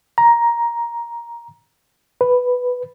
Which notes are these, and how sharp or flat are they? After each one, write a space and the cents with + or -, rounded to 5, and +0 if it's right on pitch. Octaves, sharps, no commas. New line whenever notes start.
A#5 +10
B4 +5